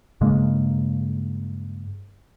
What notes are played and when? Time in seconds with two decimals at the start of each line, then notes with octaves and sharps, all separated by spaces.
0.21 G2 C#3 G#3 A#3